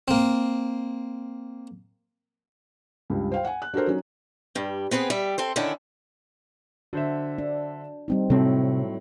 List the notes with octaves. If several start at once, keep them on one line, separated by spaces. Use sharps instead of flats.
A#3 C4
C#2 G2
C5 F5 G5
F#5 G#5
F#6
D4 F#4 A4 A#4 C5
F#3 C#4 D#4
G2 G3
B3 C4 G#4 B4
G3 E5
C4 A4 C5
D3 D#3 C#4 D4 E4
D3 F#4 C5 E5
D4
G3 C4 D#4
A2 C3 F#3 C4 A4